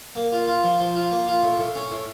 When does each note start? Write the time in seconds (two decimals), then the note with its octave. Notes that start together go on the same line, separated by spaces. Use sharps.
0.15 A#3
0.32 F4
0.48 F4
0.63 F3
0.79 F3
0.95 F4
1.12 A#3
1.28 F4
1.43 A2
1.59 A2
1.75 C#4
1.91 A2